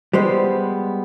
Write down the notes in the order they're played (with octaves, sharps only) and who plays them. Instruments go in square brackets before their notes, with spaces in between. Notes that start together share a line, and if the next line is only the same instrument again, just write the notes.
[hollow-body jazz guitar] G3 G#3 B3 C5